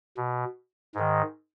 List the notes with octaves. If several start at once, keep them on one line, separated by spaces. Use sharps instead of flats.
B2
G#2 D#3